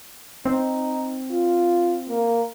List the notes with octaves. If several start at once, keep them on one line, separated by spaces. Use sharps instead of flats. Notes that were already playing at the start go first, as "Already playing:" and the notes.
C4 D#4
F4
A#3